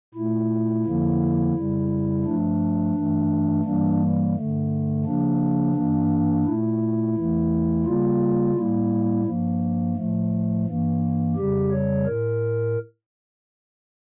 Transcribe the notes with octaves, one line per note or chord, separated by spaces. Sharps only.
A#2 A3 E4
F2 D3 F3 A#3
F2 C#3 G3
G2 F3 A3 D4
G2 E3 A3
G2 E3 G3 A#3 D4
G2 D3 A3
C#3 F3 A#3 D4
G2 E3 A#3
A#2 A3 E4
E2 E3 A3
C#3 G3 A#3 F4
A2 G3 A#3 E4
G2 F3 A#3
A2 F3 A3
G2 E3 A#3
F2 C#3 G3 G4
C#5
A2 A#4